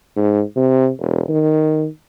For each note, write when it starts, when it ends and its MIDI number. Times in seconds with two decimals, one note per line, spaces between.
0.16 0.42 44
0.56 0.90 48
0.99 1.23 28
1.29 1.87 51